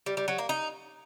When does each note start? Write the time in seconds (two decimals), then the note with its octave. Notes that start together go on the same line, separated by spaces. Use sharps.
0.06 G3
0.17 G3
0.28 F#3
0.38 A#3
0.49 D#4